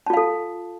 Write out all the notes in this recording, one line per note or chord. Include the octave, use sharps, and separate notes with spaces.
F4 A4 F5 A5